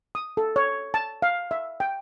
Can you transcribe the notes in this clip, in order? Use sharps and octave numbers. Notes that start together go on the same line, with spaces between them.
D#6
A4
C#5
A5
F5
E5
G5